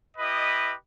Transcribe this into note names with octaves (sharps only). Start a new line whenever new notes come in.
E4 G4 B4 D#5